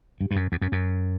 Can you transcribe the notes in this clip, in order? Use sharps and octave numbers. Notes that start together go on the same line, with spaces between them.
G2
G2
F#2
E2
F#2
F#2